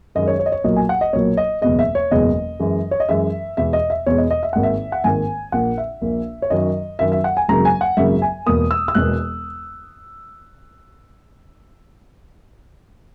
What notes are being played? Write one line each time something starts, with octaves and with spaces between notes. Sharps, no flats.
F#2 D#3 G#3 D#5
C#5
C#5
D#5
C#5
B1 A#2 F#3 A#3 D#5
G#5
F#5
D#5
B1 A#2 F#3 A#3 C#5
D#5
F#1 E2 B2 G#3 D#5
E5
C#5
F#1 E2 B2 G#3 D#5
F#2 E3 G#3
C#5
D#5
F#2 E3 G#3 E5
E2 B2 G#3 E5
D#5
E5
E2 B2 G#3 C#5
D#5
D#5
E5
G#1 G#2 D#3 A#3 F#5
E5
F#5
G#1 G#2 D#3 A#3 G#5
A#1 A#2 A#3 F#5
E5
A#1 A#2 A#3
C#5
F#2 D#3 F#3 D#5
F#2 D#3 F#3 E5
E5
F#5
G#5
G#1 F#2 C#3 F#3 A#3 A#5
G#5
F#5
G#1 F#2 C#3 F#3 A#3 E5
G#5
E1 E2 B2 A#3 D#6
E6
E6
E1 E2 B2 A#3 F#6